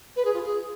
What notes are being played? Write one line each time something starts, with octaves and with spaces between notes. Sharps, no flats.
B4
G#4
F4
G#4